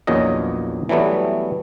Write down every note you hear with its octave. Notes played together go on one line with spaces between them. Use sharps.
A#1 E2 A#2 F#3 C#4 D#5
E3 F#3 G3 A3 B3